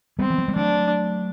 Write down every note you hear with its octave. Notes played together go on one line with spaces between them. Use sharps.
G3 B3 C4
E3
F#3
G3
F#3 A3 D4